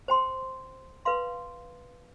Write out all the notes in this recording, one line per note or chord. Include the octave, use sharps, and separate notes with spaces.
C5 G5 C6
B4 F5 C6